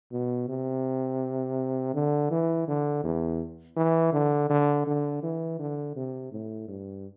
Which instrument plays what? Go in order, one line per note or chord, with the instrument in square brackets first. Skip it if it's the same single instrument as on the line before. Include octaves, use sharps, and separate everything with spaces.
[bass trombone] B2
C3
D3
E3
D3
E2
E3
D3
D3
D3
E3
D3
C3
A2
G2